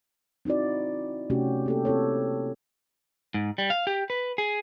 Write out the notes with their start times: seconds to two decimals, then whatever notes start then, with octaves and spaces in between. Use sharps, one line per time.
0.45 C4 D#4 E4 F#4 D5
1.30 C3 A3 C#4 F#4 G4
1.66 A#3 G4 A4
1.85 C4 E4 A4 C#5
3.34 G#2
3.58 G3
3.70 F5
3.87 G4
4.10 B4
4.38 G#4